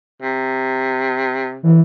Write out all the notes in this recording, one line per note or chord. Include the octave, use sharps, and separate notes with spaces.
C3
E3